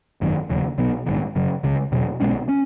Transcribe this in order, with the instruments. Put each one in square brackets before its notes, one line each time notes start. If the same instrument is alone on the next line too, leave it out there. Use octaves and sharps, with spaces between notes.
[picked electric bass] G#1 F#2 D#3
E1 D#2 C#3 F#3
B1 B2 F#3 B3
A#1 G#2 D#3
F#1 F#2 C#3 F#3
C#2 C#3 G#3
E2 B2 F#3
B1 B2 G#3 C#4
C#4